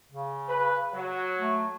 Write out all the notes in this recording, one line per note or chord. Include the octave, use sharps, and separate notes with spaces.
C#3
B4
F#3
A3